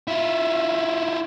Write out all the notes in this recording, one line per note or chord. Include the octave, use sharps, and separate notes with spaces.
E4 F4